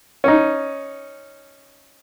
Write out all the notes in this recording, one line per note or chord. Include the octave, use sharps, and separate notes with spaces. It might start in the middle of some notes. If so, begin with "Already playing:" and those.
C#4 D#4